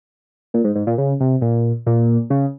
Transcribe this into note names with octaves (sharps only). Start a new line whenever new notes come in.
A#2
G#2
G#2
A#2
C#3
C3
A#2
A#2
C#3